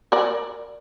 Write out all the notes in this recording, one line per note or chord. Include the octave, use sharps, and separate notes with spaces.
A#4 D5